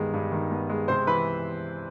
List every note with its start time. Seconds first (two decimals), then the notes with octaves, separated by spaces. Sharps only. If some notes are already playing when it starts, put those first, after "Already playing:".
Already playing: G2 D#3 G#3 B3
0.14 G2
0.32 D#3
0.51 B3
0.70 G#3
0.88 C3 C5 C6
1.07 E3 B4 B5